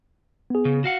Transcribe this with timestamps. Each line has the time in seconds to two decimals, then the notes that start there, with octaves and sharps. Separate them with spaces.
0.50 B3 G#4
0.65 C#3
0.84 F#4 F5 F#5